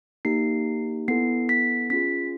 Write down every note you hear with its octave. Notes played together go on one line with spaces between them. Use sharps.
A#3 D#4 G4 C7
B3 E4 A4 C7
B6
C#4 F4 G#4 B6